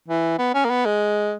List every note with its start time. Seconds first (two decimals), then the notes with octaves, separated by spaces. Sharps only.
0.08 E3
0.39 B3
0.54 C#4
0.64 A#3
0.69 B3
0.86 G#3